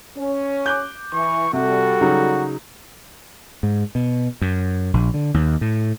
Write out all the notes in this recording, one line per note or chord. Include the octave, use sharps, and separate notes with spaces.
C#4 C#5
D6 F#6 G6
E3 C#6
C3 G3 F#4 A4
C#3 F#3 D#4
G#2
B2
F#2
A#1
D3
D#2
A2